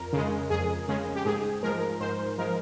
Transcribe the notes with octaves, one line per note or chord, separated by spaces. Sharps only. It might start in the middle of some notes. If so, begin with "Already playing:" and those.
Already playing: F2 A#4
C#3 G#3
F2 G#4
C#3 G#3
G4
G#2 G#4
F3 G#3 A#4
G#2 C5
F3 G#3 A#4